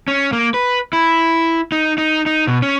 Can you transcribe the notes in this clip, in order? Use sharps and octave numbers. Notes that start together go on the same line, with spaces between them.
C#4
A#3
B4
E4
D#4
D#4
D#4
B2
C#4